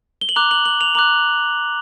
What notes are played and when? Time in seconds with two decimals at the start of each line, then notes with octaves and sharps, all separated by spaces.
0.21 G7
0.29 F#7
0.36 A#5 D6 F#6 F7
0.51 F#7
0.65 F#7
0.81 F7
0.95 A#5 D6 F#6 F#7